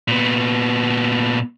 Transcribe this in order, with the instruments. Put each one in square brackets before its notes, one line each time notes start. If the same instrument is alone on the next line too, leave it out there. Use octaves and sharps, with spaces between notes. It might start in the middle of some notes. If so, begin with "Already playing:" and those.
[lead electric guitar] A#2 B3